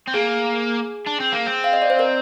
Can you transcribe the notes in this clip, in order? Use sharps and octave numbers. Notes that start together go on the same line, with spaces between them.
C4
A#3 G#4
D4
C4
A#3
C4
F5
D#5
D5
C5
A#4